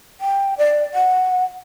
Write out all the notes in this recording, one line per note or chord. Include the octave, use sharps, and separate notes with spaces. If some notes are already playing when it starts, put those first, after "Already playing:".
G5
D5
F#5